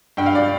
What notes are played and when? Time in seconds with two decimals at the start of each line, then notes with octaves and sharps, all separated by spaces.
0.17 G2 G5
0.26 F5
0.35 D5